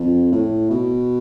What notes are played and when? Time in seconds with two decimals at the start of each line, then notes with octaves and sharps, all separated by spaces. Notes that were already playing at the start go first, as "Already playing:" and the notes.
Already playing: F2
0.31 A2
0.70 B2